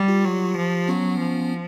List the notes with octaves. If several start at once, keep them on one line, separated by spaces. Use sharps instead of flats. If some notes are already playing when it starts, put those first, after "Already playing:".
Already playing: G3
F4 G4
F#3
F3
F#3 B3 C#4
F3